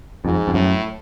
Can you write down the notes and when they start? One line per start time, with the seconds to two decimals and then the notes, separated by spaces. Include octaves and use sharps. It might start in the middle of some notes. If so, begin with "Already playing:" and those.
0.24 F2 G#2
0.48 F2
0.53 F#2 A2